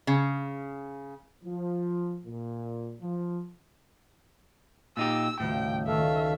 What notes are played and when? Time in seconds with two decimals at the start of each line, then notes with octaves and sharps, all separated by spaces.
0.07 C#3
1.44 F3
2.27 A#2
3.02 F3
4.97 A#2 D#4 G4 E6
5.40 D#1 A2 C#3 F#4 G5
5.87 C#2 D#3 A4 E5 F5